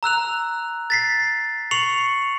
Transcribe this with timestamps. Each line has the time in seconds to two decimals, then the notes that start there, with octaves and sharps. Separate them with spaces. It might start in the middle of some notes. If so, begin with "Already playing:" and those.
0.03 A#5 E6 F#6 F7
0.90 A6 B6 C7
1.71 C#6 C7 C#7 F7 F#7